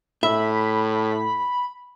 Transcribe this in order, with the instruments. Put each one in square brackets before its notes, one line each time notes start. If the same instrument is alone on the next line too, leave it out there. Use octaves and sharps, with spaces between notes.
[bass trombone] A2 [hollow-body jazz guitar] E5 [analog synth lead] B5